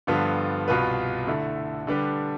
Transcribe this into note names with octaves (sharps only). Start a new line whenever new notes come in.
G2 D3 F3 B3 F4
C2 B2 B3 F4 B4
D3 A3 E4
D3 G3 D4 G4 B4